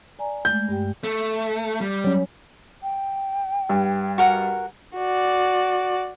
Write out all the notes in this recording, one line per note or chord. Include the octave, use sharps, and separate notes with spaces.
D5 G#5 A#5
G#3 A3 G6
G2 G4 G5
A3
G3
F#3 C#4
G5
G2
F#4 A#4 F#5
F#4 D5